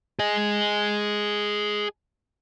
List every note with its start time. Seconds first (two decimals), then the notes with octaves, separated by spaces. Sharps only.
0.19 G#4 D#5